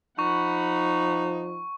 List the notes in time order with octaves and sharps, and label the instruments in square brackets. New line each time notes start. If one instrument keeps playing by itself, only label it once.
[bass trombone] F3 [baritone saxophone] D#4 [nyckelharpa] F#5 B5 [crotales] C#6